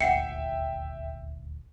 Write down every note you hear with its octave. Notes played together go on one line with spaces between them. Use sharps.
D#1 G#1 D2 E5 F#5 G5 C7 C#7